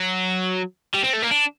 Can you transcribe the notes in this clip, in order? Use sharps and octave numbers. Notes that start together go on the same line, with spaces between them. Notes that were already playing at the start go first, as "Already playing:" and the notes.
Already playing: F#3
G3
C4
A3
A#3
D4